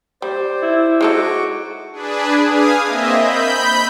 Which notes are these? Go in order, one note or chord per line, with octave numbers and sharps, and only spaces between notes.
G3 C5 D5
E4
G#3 D#4 F#4 A4 C#6 D6
D4 G#4 B4
F5 G#5 D#6
A#3 C4 D#5 E5
B5 G6